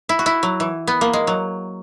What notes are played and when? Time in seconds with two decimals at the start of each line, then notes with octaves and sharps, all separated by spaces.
0.09 E4
0.19 F#4
0.26 E4
0.43 F#3
0.60 E3
0.87 B3
1.01 A#3
1.13 G#3
1.27 F#3